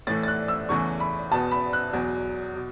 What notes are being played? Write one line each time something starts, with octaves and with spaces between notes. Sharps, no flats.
A2 E3 A3 A6
A6
F#6
E6
E2 C#3 E3 A3 C#6
B5
E2 B2 B3 A5
B5
F#6
E2 B2 F#3
B2